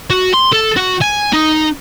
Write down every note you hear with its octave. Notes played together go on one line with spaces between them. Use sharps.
F#4
C6
A4
F#4
G#5
D#4